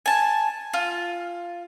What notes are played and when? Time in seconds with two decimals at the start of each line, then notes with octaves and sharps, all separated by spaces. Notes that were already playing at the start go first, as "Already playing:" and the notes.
0.06 G#5 A5
0.74 F4